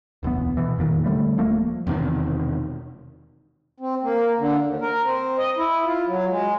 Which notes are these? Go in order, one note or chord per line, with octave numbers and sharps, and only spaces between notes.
D1 B1 E2 B3
B2 E3
F1 E2 A#2 D#3
D3 F3 G3 A3
D1 F3 A3 A#3
E1 E2 C3 D#3
C4
A#3
D3
D#2
A#4
C4
D#5
E4
F4
F#3
G#3